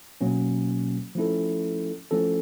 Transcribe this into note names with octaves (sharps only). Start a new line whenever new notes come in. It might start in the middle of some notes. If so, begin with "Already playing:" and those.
B2 F#3 A#3 C#4
F3 A3 C#4 E4 A4
F3 A3 C#4 E4 A4